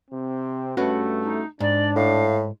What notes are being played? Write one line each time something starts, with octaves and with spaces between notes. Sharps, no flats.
C3 C4
G2 A3 C#4 F#4 B4
D#4
G#2 D4 D5
A2 F5